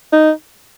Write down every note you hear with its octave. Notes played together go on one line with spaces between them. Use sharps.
D#4